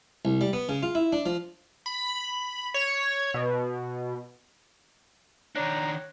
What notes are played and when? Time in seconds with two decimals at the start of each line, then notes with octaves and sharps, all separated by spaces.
0.25 C2
0.41 G3
0.53 B3
0.69 C#3
0.83 F4
0.95 E4
1.13 D4
1.26 F3
1.86 B5
2.74 C#5
3.34 B2
5.55 D#3 D4 C#5 A#5 F#6